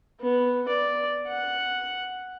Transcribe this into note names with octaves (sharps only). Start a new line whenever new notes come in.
B3
D5
F#5